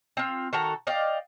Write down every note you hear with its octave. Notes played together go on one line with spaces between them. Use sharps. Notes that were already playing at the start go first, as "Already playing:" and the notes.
C4 F4
D#3 F#4 A4 A#5
D5 D#5 F5 G5